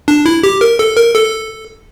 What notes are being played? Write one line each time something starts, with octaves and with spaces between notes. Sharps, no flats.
D4
E4
G4
A#4
A4
A#4
A4